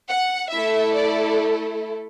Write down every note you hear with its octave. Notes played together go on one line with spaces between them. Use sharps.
F#5
A3 E4 A4 E5
D5